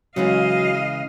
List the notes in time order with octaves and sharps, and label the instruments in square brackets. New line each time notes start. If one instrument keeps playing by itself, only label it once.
[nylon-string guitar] C#3 E3 G#3 [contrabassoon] F#3 [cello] D#5 F5